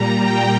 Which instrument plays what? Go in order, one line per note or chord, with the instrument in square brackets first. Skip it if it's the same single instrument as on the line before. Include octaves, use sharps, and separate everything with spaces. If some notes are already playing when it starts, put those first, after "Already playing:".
Already playing: [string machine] A#2 G3 A#5
G5